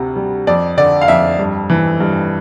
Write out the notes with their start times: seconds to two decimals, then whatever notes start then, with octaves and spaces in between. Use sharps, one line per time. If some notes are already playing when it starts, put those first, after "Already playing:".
Already playing: D2 C3
0.16 G3
0.47 F2 D5
0.77 D3 D5
1.02 F5
1.08 F2 E5
1.39 G2
1.70 E3
2.00 G2